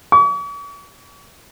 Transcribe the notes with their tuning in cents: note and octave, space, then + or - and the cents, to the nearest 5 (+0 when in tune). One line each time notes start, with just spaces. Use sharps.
C#6 +45